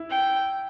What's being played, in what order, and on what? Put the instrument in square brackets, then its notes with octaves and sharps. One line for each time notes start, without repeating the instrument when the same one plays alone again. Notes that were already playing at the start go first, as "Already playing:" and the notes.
Already playing: [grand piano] E4
[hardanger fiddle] G5